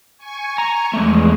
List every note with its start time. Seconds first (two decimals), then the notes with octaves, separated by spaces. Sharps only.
0.17 G#5 C#6
0.58 A#5
0.93 E2 F3 G#3 A3